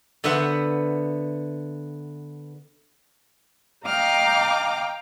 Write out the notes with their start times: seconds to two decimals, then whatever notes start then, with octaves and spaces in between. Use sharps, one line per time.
0.24 D3 B3 C5 E5 F#5
3.86 D#5 F5 G5 A#5 D6 F6